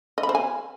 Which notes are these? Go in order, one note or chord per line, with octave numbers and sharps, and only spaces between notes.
D#5
B5
C5
G#5